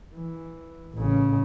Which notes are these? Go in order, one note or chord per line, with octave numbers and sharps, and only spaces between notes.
E3
A1 C#3